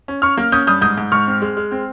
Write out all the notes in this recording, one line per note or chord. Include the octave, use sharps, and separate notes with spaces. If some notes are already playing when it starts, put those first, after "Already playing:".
C#4
C#4 C#6 F6
A#3
C#4 D#6 G6
G2 D#6 G6
G#2 D#6 G6
G#2
G#2 C#6 F6
C4
G#3
G#3
C4